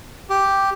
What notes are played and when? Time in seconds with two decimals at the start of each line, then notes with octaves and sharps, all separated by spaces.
0.30 G4